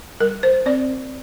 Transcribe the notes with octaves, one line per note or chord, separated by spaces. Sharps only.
G3 A#4
C5
C4 D5